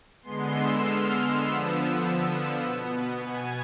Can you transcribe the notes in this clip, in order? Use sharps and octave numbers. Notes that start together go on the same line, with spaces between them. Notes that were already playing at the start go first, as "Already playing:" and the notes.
D3 G#3 B3 C6
E6
F6
D3 F3 B3 E6
B2 B3
G#5